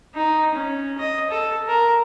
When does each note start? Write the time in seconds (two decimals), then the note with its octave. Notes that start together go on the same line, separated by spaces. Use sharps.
0.15 D#4
0.54 C#4
0.98 D#5
1.30 A4
1.68 A#4